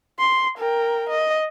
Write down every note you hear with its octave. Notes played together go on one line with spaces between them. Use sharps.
C6
A#4 G5
D#5